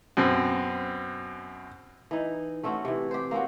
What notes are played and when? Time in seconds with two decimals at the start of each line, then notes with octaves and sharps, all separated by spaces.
0.17 F#2 B2 C4
2.11 E3 D#4
2.64 A3 C4 C#4 F#4
2.85 C3 E3
3.11 G4 C5
3.31 A#3 C4 C#4 F#4